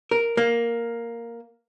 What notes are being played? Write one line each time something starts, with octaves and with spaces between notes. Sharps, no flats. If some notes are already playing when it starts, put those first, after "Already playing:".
A#4
A#3